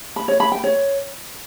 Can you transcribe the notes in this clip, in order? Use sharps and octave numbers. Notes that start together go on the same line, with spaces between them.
B5
C#5
B5
G5
C#5